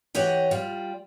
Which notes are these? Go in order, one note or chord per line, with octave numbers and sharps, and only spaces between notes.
E3 G4 C#5 D#5 F#5 G5
G3 F4